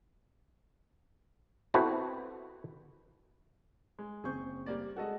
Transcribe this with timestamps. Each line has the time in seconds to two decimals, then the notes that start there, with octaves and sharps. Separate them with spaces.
1.74 B3 C4 E4 F#4 A4
3.99 G#3
4.24 F#1 C4 G#4 C#6 G6
4.66 G3 A#3 D5
4.96 G#3 F#4 G#4 A4 D#5